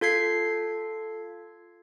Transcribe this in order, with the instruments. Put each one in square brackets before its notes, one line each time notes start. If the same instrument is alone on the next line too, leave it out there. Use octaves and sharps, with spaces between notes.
[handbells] F4 A4 G#6 C7